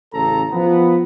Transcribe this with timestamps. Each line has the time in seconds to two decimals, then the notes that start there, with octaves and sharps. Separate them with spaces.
0.13 A1 C#3 A4 A#5
0.52 F3 B3